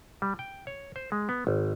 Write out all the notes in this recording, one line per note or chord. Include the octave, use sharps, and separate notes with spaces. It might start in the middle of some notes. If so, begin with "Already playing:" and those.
G3
G5
C#5
C5
G#3
B3
G#1